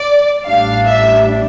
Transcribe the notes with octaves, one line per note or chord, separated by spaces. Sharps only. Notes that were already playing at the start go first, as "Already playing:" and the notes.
Already playing: D5
A1 A2 G3 D4 F5
E5